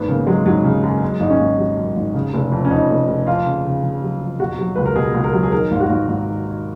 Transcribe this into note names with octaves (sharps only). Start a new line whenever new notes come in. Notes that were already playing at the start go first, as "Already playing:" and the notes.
Already playing: G#1 B3
C#3 A#3
F#3 G#3
G#1 F#3
C#3
F#2
F#2 G#3
G#1 D#4
C#4
G#1
F#3
F#2
G#1
C#3
F1
F2
C#4
F2 D#4
F1
F1
F2 F4
C#3
C#3
C#3
F#3
F2
B2 F#4
F#3
C#2 B4
A#4
B2 G#4
C#2
A#4
F#3
G#4
D#3 A#4
G#1 F4
F#4
G#1
G#1
D#3
D#3